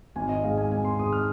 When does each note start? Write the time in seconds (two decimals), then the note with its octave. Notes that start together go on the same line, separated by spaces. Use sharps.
0.16 G#1 G#5
0.29 D#5
0.40 D#5
0.43 G#2 G#3 F5
0.57 G#5
0.71 G#1 G#5
0.85 C6
0.99 G#2 G#3 D#6
1.13 F6